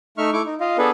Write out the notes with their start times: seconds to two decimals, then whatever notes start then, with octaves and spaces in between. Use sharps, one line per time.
0.18 A3 D#4 E5 C#6 F6
0.33 A3 E4 C#6 D6
0.46 D#4
0.60 F4 D#5 F5
0.78 B3 D4 G#4 A4 B4